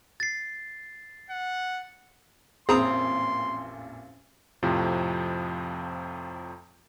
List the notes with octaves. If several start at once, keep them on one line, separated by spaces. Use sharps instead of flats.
A6 C7
F#5
A1 F2 A#2 C4 G#4 A#5 C6 D#6
F2 A2 C3 F3